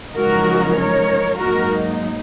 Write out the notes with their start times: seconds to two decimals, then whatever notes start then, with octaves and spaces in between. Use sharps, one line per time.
0.15 F#2 C#3 F3 G#3 D#4 F#4 A#4
0.77 A#4 C#5
1.38 G#2 F#3 A#3 D#4 F#4 A#4